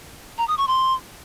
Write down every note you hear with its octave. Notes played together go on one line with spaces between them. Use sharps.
A#5
D#6
C#6
C6